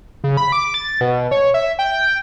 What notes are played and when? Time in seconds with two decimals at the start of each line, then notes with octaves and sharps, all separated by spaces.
0.24 C#3
0.37 B5
0.52 D6
0.74 A6
1.01 B2
1.31 C#5
1.54 E5
1.79 G5